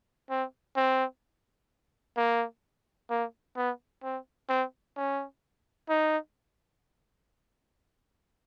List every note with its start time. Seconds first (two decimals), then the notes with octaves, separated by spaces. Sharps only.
0.30 C4
0.77 C4
2.17 A#3
3.10 A#3
3.57 B3
4.03 C4
4.49 C4
4.97 C#4
5.89 D#4